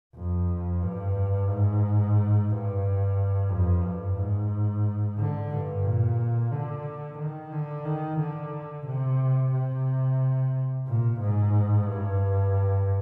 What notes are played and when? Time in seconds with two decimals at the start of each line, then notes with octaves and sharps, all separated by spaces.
0.15 F2
0.83 G2
1.49 G#2
2.50 G2
3.50 F2
3.84 G2
4.17 G#2
5.18 D3
5.51 G2
5.84 A#2
6.51 D3
7.18 D#3
7.52 D3
7.85 D#3
8.19 D3
8.86 C3
9.53 C3
10.87 A#2
11.20 G#2
11.87 G2